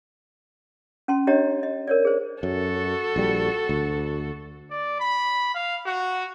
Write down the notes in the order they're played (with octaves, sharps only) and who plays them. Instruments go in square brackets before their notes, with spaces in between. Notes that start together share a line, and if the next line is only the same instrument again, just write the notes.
[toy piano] C#4 A5 C6
D4 G4 C#5 D#5 A#5
D#5
A#4 C#5 D5
G#4 C5
[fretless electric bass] F#2 [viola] F#4 A4
[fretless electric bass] A#1 G3
D2
[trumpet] D5
B5
F5
F#4